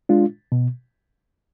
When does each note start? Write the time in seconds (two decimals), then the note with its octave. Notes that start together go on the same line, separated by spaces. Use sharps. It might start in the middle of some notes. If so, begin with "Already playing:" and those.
0.09 G#3 D4 F4
0.52 B2